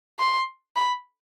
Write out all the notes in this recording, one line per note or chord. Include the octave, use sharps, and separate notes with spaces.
C6
B5